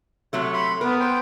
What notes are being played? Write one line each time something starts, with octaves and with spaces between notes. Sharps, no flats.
C3 F#3 A3 C#5
B5 C6
B3 A#4 B4
C5 G5